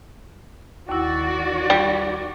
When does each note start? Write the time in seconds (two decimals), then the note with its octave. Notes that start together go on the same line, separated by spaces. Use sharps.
0.89 D#2 D#3 E4 F#4 D5
1.70 G3